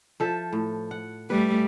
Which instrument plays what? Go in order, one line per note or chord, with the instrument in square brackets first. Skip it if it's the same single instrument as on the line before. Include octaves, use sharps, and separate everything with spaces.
[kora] F3 A4 E5
A2
F#5
[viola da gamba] G3 A3 [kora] B4